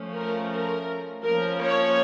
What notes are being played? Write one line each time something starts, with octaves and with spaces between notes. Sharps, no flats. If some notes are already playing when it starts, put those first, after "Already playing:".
Already playing: F3 A3 C#4
A#4
A#4
F3 A#3 C#4 A#4
C#5